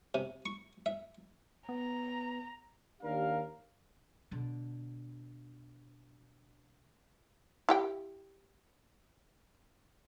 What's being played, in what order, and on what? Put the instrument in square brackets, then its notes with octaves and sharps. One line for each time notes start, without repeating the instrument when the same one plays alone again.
[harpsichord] C3
C#6
E5
[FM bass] B3 [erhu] A#5
[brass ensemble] D#2 D4 G4 A#4 F5
[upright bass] B2 D3
[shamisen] E4 G4 G5